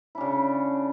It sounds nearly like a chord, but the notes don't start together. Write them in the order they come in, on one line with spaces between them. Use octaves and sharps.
E4 D4 C#3